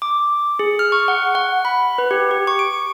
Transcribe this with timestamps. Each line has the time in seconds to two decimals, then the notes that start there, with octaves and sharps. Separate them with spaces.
0.02 D6
0.59 G#4
0.79 F6
0.92 C#6
1.08 F#5
1.35 F#5
1.65 B5
1.98 B4
2.11 G4
2.31 G4
2.47 C#6
2.59 D7